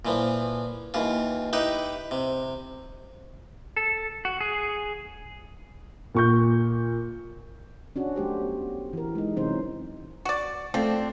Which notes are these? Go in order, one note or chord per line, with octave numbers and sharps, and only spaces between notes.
A#2 E3 F3
D#2 E3 F4
D#4 E4 G4 B4
C3
A4
F#4
G#4
A#2 C#6 G6
C#4 D4 F#4
F#3 A3 G4 C5
B3
E3 A#4
G#3 D#4
C3 E3 F#3 C#4 D#4 C5
F#4 D5
F3 A3 C4 D4